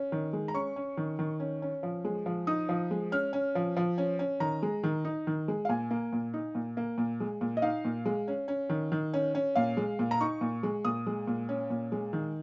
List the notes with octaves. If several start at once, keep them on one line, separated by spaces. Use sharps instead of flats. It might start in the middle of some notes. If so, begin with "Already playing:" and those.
Already playing: C#4
D#3
G#3
A#5
C#4 C#6
C#4
D#3
D#3
C#4
C#4
F3
G#3
F3
D#4 D#6
F3
G#3
C#4 F6
C#4
F3
F3
C#4
C#4
D#3 A#5
G#3
D#3
D#4
D#3
G#3
F5
A#2 G#5
A#3
A#2
D#4
A#2
A#3
A#2
G#3
A#2
D#5
D#4 F5
A#2
G#3
C#4
C#4
D#3
D#3
C#4
C#4
A#2 F5
G#3
A#2
A#5
D#4 C#6
A#2
G#3
A#2 D#6
G#3
A#2
C#4
A#2
G#3
D#3